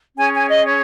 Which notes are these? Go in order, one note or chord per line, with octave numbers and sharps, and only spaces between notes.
C#4 G#4 C#5 G#5
G#5
D#5
C#5